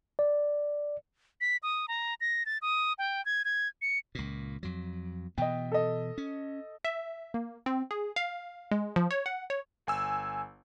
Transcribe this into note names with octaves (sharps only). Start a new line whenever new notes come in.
D5
B6
D#6
A#5
A#6
A6
D#6
G5
G#6
G#6
C#7
C#2 A#2
F2 F#3
B2 E3 B3 D#5 G5
A4 D#5
C#4
E5
A#3
C4
G#4
F5
G#3
F3
C#5
F#5
C#5
G1 G#5 E6